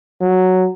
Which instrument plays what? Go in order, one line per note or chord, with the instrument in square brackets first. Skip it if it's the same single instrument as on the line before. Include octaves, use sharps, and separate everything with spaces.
[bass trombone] F#3